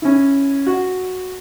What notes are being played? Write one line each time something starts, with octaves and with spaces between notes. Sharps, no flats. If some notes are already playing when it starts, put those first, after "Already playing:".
C#4 E4
F#4